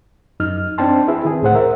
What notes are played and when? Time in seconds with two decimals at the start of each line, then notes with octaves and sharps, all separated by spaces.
0.40 F#2 D#4 F6
0.78 C4 D4 D#4 G5 A5 C6
1.08 E4 G#4 B4 E5
1.25 D#3 C4 G#4
1.42 C#2 A2 C5 F#5
1.55 A#4 E5